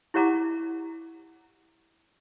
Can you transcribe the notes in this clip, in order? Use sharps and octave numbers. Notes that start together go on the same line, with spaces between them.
E4 G4 C#5 F#5 A#5 D6